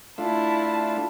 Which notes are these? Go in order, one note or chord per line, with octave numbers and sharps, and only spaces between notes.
A3 D4 E4 F4 A5